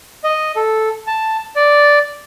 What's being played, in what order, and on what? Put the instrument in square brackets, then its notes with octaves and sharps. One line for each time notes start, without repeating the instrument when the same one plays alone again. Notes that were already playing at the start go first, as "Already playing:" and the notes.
[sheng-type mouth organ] D#5
A4
A5
D5